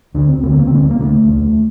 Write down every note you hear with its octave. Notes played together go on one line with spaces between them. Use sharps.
D2 D3 D4
C4
D2 D3 A#3
C4
A#3
C4
D2 D3 A#3
C4
A#3
D2 D3 A3
D2 D3